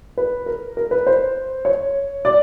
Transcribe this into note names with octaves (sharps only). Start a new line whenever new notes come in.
B4
A#4
A#4
B4
C5
C#5
D5